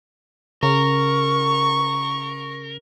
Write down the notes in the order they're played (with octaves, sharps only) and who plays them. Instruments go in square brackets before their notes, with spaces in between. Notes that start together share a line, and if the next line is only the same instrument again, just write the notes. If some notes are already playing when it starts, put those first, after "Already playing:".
[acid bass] C#3 [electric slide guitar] A#4 [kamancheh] C#6